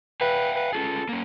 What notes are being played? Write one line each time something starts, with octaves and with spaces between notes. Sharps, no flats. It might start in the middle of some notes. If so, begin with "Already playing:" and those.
B4 E5 F5 G5
B4
C#4 F4 G#4 A4
A#3 C#4